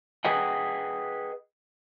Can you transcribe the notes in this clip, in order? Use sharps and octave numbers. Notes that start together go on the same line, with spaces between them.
G#4 B4 D#5 F#5 G5